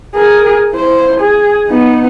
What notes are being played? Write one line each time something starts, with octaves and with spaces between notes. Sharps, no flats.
G#4 A#4
E4 C5
G#4
B3 D#4